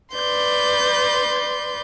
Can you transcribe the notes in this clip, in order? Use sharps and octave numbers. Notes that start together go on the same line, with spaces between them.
B4 D5 C6 G6